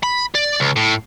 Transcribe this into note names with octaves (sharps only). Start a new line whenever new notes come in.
B5
D5
C#2
A2